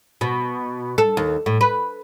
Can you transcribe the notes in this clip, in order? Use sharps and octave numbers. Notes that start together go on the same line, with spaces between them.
B2
A4
D#2
A2
B4